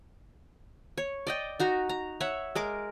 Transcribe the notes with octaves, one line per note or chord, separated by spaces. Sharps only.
C#5
D5 D#5 G5
D#4 F#4 A#5
A#5
C#5 E5 F#5
G#3 A#4 D6